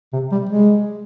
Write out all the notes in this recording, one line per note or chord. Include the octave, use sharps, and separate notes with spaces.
C3
G3
G#3